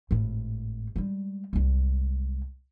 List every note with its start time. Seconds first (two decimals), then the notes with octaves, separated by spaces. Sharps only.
0.11 G#1 A2
0.96 G3 G#3
1.53 C2 G#3